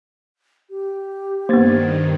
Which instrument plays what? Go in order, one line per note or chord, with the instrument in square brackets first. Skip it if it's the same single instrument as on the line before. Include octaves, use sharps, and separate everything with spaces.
[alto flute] G4
[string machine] G2 D#3 [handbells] A#3 B3 [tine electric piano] C5 G#6 A6